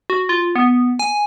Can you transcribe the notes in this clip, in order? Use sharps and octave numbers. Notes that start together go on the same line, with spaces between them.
F#4
F4
B3
G#5